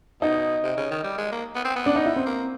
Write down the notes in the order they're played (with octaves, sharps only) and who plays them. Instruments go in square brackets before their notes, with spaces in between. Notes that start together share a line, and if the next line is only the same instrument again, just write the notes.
[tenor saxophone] B2 [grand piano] D#4
[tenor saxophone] C3
C#3
D#3
G3
G#3
A#3
B3
C4
B3
[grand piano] D4
D#4
E4
C4
[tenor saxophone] A#3